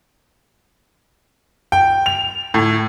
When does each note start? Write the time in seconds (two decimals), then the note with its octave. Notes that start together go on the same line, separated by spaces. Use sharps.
1.72 G5
2.06 F7
2.54 A2